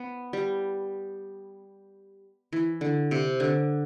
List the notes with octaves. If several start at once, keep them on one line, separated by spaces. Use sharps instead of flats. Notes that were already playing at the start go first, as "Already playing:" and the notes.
Already playing: B3
G3
E3
D3
C3
D3